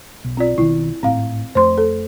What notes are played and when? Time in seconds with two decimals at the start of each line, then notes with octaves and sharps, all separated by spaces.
0.25 B1
0.37 C4 F4 D5
0.58 B1 D#3 E4
1.03 G#1 A2 C4 F5
1.55 F2 A3 C5 C6
1.78 A4